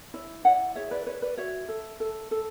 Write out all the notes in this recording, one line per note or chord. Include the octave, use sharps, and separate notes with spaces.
E4 C#5
E4 D5 F#5
G#4 C#5 E5
B4 D5
B4 C#5
B4 D5
F#4 C#5 E5
A4
A4
A4